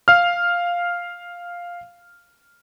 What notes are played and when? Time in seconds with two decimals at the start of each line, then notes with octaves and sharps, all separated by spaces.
0.08 F5 F6